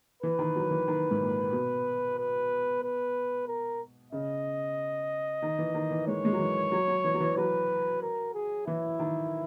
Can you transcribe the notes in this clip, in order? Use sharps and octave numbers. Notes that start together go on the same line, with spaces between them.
E3 B4
D#3
F#3
E3
D#3
G#2
A#2
B2
B4
B4
A#4
C#3 D#5
D#3
E3
D#3
E3
G#3 C#5
G#3
F#3
E3
F#3
F#3
E3
F#3
E3
F#3 B4
A#4
G#4
E3 E4
D#3